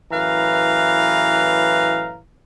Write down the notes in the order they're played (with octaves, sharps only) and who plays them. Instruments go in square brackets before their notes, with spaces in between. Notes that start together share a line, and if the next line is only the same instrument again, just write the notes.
[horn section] F#2 A2 E3 B4 F5 A#5